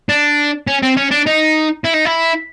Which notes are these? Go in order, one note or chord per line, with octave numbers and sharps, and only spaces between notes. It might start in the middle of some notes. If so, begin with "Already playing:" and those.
D4
C#4
C4
C#4
D4
D#4
E4
D#4
E4